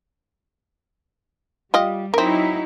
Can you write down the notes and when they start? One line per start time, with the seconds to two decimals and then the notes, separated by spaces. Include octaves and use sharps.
1.74 G3 F4 G4 D#5
2.14 F#3 C4 D#4 E4 A#4